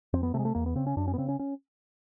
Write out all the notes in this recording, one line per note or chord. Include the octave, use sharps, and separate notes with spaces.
F2 C4
B3
C3 A3
G#3
A3
E2 A#3
B3
C#3 C4
C#4
F#2 D4
C#4
B3
C#3 C4
C#4
C#4